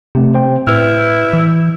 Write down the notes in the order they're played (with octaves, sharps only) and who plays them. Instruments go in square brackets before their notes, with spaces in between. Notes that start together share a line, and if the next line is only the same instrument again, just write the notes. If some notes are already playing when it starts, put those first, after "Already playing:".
[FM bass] C3 [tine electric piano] A3 C4 G4
[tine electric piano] C5 G5
[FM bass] A2 [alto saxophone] E4 [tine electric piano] B4 E6 F6
[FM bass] E3 [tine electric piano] E6